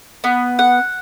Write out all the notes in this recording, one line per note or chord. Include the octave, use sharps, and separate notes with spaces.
B3
F#5